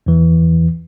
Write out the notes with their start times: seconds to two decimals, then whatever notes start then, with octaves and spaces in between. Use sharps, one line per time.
0.06 E2 E3